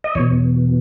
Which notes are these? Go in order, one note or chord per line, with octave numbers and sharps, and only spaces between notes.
D#5
E2 B2 C#5